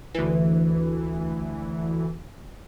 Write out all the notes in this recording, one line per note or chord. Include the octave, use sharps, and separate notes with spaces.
D2 E3